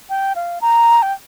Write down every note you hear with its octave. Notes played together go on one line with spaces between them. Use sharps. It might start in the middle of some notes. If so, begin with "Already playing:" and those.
G5
F5
A#5
G5